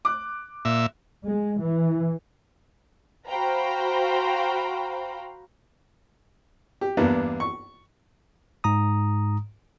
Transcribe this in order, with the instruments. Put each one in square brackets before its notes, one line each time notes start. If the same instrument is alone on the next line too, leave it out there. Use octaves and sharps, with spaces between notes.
[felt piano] D6 F#6
[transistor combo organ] A#2 E5
[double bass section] G#3
E3
[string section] F#4 C5 F5 G5 A#5 B5
[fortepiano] G4
E2 G2 A#3 B3 D4
C#6
[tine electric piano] G#2 A#5 D#6